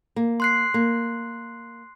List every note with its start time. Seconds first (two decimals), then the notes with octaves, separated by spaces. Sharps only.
0.16 A#3
0.40 C6 F#6 C7
0.74 A#3